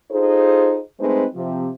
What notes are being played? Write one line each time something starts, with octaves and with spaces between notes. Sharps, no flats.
D#4 F4 G#4 A4 C5
G#3 A3 C4 D#4 B4 C5
C3 F3